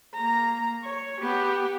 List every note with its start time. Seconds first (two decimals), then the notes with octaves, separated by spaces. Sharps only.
0.14 A#3 A#5
0.84 C#5
1.21 B3 G4